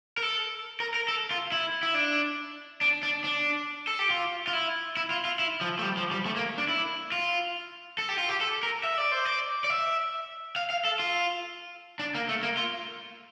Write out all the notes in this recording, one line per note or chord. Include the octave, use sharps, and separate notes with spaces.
A#4
A4
A#4
A#4
A4
F4
E4
E4
D4
D4
D4
D4
A4
G4
F4
F4
E4
E4
F4
F4
E4
F3
A3
G3
F3
G3
A3
A#3
D4
E4
F4
A4
G4
F4
G4
A4
A#4
E5
D5
C5
D5
D5
E5
F5
F5
A4
F4
D4
A#3
A3
A#3
F4